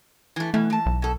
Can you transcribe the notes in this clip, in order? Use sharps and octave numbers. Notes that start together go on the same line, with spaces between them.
E3 A3
B2 E3 A3
E3 A5
B1
B2 A4